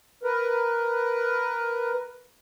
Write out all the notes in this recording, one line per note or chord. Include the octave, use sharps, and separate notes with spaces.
A#4 B4